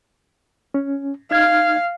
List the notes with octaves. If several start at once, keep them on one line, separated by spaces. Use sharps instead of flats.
C#4
D#4 F5 F6 G#6